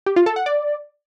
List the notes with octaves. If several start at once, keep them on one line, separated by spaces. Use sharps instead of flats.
G4
F4
A4
F#5
D5